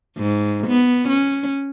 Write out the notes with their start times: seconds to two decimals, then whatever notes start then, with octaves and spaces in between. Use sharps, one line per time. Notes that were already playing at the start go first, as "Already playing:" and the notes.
0.18 G#2
0.67 B3
1.08 C#4